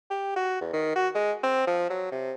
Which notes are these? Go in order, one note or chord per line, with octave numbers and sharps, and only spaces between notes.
G4
F#4
E2
D#3
F#4
G#3
C4
F3
F#3
C3